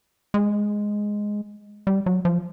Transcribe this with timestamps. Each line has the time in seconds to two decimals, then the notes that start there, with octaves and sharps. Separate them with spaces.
0.34 G#3
1.87 G3
2.06 F#3
2.25 F3